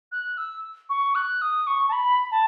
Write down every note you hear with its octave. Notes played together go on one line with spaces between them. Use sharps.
F#6
E6
C#6
F#6
D#6
C#6
A5
B5
A5